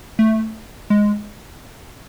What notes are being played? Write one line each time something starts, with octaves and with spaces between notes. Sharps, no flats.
A3
G#3